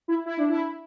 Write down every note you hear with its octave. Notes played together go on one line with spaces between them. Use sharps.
E4
E4
D4
E4